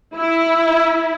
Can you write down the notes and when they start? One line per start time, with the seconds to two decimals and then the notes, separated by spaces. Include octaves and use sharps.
0.14 E4